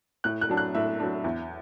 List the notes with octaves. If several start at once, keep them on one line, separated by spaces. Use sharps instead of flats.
A2 F#6
F#6
F#3 D4
F#6
A2 E5
F#3 D4
E2